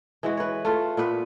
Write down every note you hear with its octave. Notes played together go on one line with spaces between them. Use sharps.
E3 G#3 F#4
B4 C#5
A3 F4
A#2 B3 B4